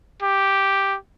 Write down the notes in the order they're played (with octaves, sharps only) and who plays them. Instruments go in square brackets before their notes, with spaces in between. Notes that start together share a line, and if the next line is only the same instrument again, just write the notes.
[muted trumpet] G4